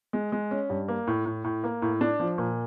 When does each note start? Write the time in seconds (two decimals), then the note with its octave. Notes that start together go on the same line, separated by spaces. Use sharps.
0.13 G#3
0.32 G#3
0.51 C#4
0.69 G2
0.88 A#3
1.07 A2
1.26 A2
1.44 A2
1.64 A#3
1.82 A2
2.01 D4
2.20 F3
2.38 A#2